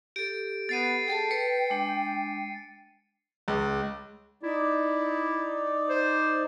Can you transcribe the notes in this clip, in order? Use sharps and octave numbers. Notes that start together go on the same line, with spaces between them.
G4 A4 D7
B3 A6 C7 D#7
G#4 A4 G5 A5
B4 C#7
G#3 D4
C#2
D#4 E4 D5
C5